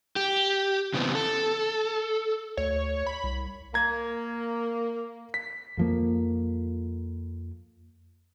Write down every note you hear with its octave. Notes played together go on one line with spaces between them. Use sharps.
G4
C#3 E3 B3 C4
A4
D2 C#5
B5
C2
A#3 A#5 G#6
B6
F2 F3 A#3